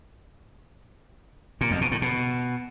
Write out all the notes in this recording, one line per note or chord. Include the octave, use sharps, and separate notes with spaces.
A#2
F2
B2
A2
B2